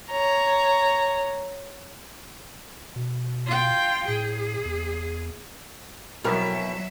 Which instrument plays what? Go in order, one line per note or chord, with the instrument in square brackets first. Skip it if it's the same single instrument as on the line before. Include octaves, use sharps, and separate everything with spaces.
[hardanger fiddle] C#5 A#5
[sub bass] B2
[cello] F4 G5
[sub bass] A2 [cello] G#4
[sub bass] E2
[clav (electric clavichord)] F2 E4 [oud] B2 A#4 [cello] F#3 E5